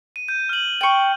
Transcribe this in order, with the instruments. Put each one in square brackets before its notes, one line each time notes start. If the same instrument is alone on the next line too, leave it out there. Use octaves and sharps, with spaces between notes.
[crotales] D#7
G6 D#7
F6 F#7
[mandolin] G5 C#6